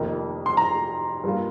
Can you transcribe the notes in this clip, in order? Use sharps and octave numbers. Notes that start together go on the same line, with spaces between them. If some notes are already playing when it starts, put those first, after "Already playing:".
Already playing: F1 F2 D#3 A#3 D#4
C6
A#5
G2 G3 A#3 F4